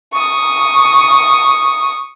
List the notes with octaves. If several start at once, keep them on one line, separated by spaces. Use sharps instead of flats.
C#6 D#6